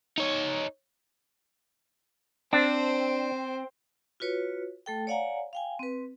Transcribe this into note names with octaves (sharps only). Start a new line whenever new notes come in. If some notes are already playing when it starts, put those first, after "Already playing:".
D#4 C#5
C4 D4 C5
F4 F#4 B4 C#5
A3 A4 G5
C#5 D5 F5 F#5 G#5 A#5
F5 G5 G#5
C4 B4